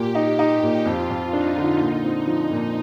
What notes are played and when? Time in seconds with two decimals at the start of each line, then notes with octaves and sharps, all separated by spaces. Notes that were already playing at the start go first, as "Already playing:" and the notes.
Already playing: A#2 G4
0.15 D#4
0.39 D#4
0.63 A#2
0.86 F2 F4
1.10 F2
1.33 D4 D#4
1.58 D3
1.80 A#2 D#4
2.04 C4
2.27 F3
2.51 A#2